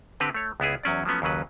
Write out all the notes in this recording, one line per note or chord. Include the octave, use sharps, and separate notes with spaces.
D3 C4 G4 B4
A3 C#5
C#2 B3 E4 G#4
E2 F#3 C#4 D5
F3 F#3 A3 B3 C#4
D#2 C#3 F#3 B4